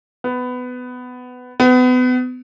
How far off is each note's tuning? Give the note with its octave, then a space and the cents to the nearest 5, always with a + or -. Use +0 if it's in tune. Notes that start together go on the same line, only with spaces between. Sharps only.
B3 +15
B3 +30